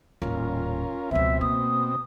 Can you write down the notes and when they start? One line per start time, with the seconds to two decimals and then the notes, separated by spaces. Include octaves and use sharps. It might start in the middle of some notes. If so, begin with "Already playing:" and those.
0.22 D#1 A1 C#4 F4 A#4
1.11 C#2 B2 F3 C4 E5
1.41 A#3 D#6